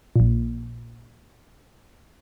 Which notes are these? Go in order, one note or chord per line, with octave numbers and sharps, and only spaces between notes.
A#1 A#2